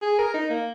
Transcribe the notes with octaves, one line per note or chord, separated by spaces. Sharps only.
G#4
A#4
D#4
A#3